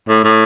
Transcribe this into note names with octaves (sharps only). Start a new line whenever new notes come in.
A2
A2